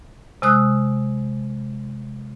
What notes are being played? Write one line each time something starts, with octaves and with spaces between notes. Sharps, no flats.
C3 G#3 D#6 E6 F#6